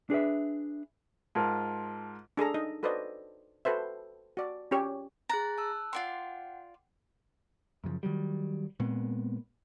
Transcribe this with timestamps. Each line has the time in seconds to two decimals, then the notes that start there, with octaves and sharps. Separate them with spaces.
0.10 D4 G#4 B4 E5
1.35 G#2 F4 A#4 A5 G#6
2.37 D4 G#4 A4 A#5
2.54 D#4 D#5
2.83 F#4 A4 B4 C5 D5 D#5
3.65 F#4 A4 B4 C5 E5
4.37 F#4 D5
4.71 C#4 F4 G4 C#5
5.29 G#4 A#5 F#6 A6
5.58 A5 E6 F#6
5.93 F4 D5 F#5 G5 C6
7.84 F#2 C#3 E3 F3
8.03 D#3 F#3 G3
8.80 A#2 G#3 B3 C4